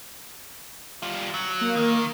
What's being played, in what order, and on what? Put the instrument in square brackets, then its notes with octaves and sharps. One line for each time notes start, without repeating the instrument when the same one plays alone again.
[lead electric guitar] G3 F4
F#3
[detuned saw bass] A#3
[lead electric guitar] D#3